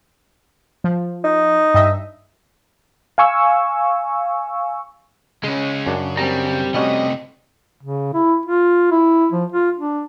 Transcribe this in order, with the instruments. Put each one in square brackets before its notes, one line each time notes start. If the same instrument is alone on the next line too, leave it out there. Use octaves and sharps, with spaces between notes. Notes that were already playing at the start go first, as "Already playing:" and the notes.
[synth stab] F3
[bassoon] D#4
[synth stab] G2 D#5 E5
[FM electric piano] F5 G#5 C#6 E6
[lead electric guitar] C#3 [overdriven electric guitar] G#3 C#4
[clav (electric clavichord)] F#2 D4
[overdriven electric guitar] G3 [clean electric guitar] C4 A#5
[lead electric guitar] C3 A3 [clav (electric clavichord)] G3 C#4 F#4 [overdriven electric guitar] D#5
[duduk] C#3
E4
F4
E4
F3
F4
D4